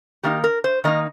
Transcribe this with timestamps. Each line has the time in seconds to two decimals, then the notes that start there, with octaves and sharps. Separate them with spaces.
0.23 D#3 A#3 D#4 G4
0.44 A#4
0.64 C5
0.84 D#3 A#3 D#4 D#5